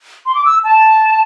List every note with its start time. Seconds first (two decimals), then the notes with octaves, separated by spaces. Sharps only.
0.26 C6
0.35 D6
0.45 E6
0.64 A5